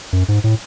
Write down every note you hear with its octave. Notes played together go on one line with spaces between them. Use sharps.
F#2
G#2
A2